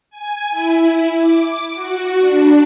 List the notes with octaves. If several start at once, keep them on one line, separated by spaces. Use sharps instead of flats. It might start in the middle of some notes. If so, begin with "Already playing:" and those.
G#5
E4
E4
D6
F#4
D4